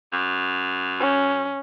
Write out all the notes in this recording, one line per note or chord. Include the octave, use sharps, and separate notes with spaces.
F#2
C#4